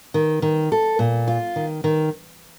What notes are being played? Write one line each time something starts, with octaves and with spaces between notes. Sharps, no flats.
D#3
D#3
A4
A#2
F4
D#3
D#3